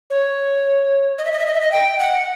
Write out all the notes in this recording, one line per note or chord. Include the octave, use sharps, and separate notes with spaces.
C#5
D#5
E5
D#5
E5
D#5
E5
D#5
G5
F#5